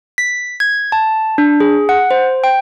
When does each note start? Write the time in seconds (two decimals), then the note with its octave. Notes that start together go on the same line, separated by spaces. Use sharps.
0.18 B6
0.60 G#6
0.92 A5
1.38 D4
1.60 G#4
1.89 F#5
2.11 C5
2.44 G5